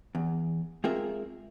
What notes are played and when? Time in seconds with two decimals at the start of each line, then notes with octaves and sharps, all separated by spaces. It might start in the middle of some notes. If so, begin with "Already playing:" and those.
0.15 E2
0.84 G#3 C4 F4 G#4 A#4 E5